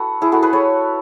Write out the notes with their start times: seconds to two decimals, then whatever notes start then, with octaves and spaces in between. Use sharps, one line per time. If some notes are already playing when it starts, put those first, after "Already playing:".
Already playing: F#4 A4 B4
0.22 E4 G#4
0.32 F#4 A4
0.42 G#4 B4
0.53 A4 C#5